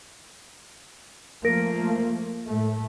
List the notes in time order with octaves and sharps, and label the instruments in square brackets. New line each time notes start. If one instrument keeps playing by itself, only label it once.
[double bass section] F3 A3 A#3 [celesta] A#4 A#6 D7
[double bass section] A2 A3